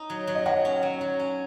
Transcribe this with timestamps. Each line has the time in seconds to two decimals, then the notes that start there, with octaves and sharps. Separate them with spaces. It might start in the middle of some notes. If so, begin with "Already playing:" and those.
Already playing: D#4
0.10 F#3
0.27 F#3
0.35 D#5
0.46 F#3 F#5
0.65 C#4
0.83 F#3
1.01 F#3
1.19 C#4